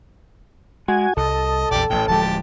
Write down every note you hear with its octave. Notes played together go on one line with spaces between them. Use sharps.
G#3 F#4 G#5
C2 A4 D#5
A#1 E2 G4 D5
A1 A2 G5
D1 F3 G#3 G4 A5